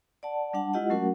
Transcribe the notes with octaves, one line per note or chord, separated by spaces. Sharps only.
D5 F#5 A5
G3 D4 F#5 A5
G#3 E4 F4 G4 D#5 F#5
F#3 A3 C#4 F#4 A#4 F#5